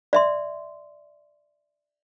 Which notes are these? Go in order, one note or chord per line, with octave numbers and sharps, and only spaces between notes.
D5 E5 C6